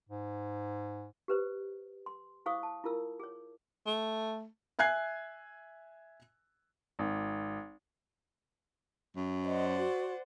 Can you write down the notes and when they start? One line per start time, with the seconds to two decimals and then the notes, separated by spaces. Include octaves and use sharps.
0.09 G#2
1.28 G4 B4 C5
2.06 C6
2.46 E4 G#4 C5 F5 C#6 D#6
2.63 A5
2.84 E4 F4 A#4 E6
3.20 G#4 C#5
3.86 A3
4.79 E5 G#5 F#6 G#6 C7
6.99 G#1
9.16 F#2
9.46 C5 D5 D#5 F#5
9.76 F#4